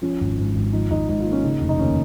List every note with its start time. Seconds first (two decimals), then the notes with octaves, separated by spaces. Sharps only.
0.02 F3 C#4
0.20 G#1
0.38 G#2
0.55 G#1
0.73 F3 D#4
0.90 G#1 D#4
1.09 G#2 D#4
1.20 F4
1.26 A#3
1.32 C#4
1.44 C#3 D#4
1.61 F1
1.69 D#4
1.79 D#2 C#4